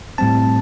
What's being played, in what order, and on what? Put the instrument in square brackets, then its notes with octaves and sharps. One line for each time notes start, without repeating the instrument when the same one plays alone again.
[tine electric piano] A2 G3 C4 A5